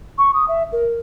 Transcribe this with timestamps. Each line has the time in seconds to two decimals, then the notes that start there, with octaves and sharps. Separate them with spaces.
0.18 C#6
0.34 D#6
0.48 E5
0.72 A#4